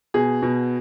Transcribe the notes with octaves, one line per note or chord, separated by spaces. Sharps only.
B2 G#4
B2